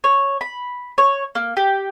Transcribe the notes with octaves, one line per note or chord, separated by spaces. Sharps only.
C#5
B5
C#5
A#3
G4